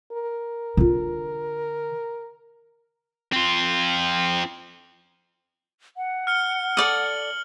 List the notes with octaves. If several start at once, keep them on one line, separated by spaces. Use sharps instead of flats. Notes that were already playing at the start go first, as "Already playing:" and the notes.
A#4
D3 F4
C4 F4
F#5
F6 C#7 G7
A4 D5 D#6 F#7